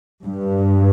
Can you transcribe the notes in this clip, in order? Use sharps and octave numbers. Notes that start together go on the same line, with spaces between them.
G2